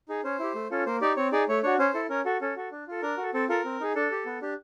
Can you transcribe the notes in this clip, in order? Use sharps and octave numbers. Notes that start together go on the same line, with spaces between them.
D#4 G#4
C#4 C5
E4 G4
A3
C#4 F4 A4
A#3 C5
D#4 G4 D5
C4 C#5
D#4 G#4 D5
A3 C#5
D4 F#4 C#5
C#4 C5
E4 A4
C#4 A#4
F#4 A4
C#4 A4
F#4 A4
D4
F4 A4
D4 A#4
F#4 A4
C4 A4
F4 A4 A#4
C4
D#4 G#4
D4 A4
G4
B3
D4 G4